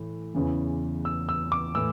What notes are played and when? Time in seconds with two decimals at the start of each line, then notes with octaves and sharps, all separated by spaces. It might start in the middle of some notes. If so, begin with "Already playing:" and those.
Already playing: A2 E3
0.35 E2 C#3 E3
1.05 E6
1.29 E6
1.52 D6
1.75 A2 E3 E6